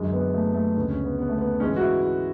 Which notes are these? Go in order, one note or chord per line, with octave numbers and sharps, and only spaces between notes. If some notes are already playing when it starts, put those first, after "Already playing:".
Already playing: F#2 D3 G#3
B3
A3
A3
D2 C#3 G#3 B3
C#4
B3
B3
A3
B3
G#2 E3 G#3 C#4
F#4
E4
E4